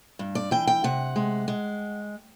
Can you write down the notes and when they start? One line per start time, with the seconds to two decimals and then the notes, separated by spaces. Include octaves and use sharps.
0.19 G2
0.35 D5
0.51 E3 G5
0.67 G5
0.84 C3 F#5
1.16 G#3
1.48 G#3